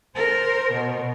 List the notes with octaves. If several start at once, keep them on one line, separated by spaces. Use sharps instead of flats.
A#4 C5
B2